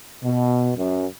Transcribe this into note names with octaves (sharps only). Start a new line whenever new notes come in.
B2
F#2